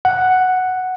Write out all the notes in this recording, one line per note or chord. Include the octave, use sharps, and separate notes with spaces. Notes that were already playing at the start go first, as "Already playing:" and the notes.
F#5